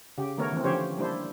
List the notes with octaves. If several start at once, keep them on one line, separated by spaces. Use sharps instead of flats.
C#3 G4
D#3 A3 B3 A#4 C#5
E3 C4
D3 F3 C#4 G4 C5 C#5
G3 A#3 D4 E4 C5